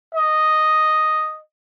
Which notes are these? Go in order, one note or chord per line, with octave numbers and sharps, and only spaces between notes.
D#5